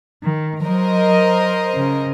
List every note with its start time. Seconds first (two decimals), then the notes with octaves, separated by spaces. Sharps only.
0.23 D#3
0.64 F#3 A#4 C5 D#5
1.75 C#3